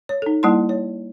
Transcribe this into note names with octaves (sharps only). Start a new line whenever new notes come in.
C#5
D#4 A4
G3 A#3 E4 F#5 A5 C6
C#5